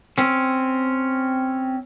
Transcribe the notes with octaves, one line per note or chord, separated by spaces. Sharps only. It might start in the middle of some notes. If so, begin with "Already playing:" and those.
C4 C#4